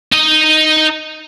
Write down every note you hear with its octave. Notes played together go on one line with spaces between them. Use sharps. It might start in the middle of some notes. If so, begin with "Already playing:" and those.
D#4 D#5